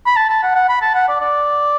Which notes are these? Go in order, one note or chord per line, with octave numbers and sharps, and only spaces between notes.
B5
A5
A5
F#5
F#5
B5
A5
F#5
D5
D5